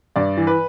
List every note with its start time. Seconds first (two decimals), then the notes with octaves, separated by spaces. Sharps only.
0.16 G2 D5
0.37 E3
0.47 B4